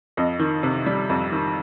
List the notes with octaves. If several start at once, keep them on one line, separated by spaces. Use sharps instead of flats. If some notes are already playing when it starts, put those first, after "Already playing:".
F2 D#5
D#3
C3
G3
F2
D#3